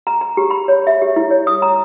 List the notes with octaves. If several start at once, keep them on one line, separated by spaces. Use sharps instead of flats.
A#5
A#5
G4
B5
C#5
E5
G4
E4
C#5
D#6
A#5